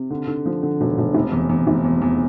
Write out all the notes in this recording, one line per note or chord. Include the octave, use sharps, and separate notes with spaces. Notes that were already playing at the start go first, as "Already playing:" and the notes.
Already playing: C3
D3
D3
F3
D3
E1
E1
F1
E2
E2
F1
E2
E2